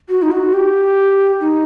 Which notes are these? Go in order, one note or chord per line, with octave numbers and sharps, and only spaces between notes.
F#4
D#4
F#4
G4
D#4